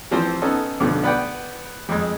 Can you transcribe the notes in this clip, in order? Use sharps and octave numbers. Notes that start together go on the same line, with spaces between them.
E3 F3 C4 C5
B3 C#4 D#4 A4
B1 G2 D3 F3 B3
B3 B4 D5 F#5 G5
F2 G#3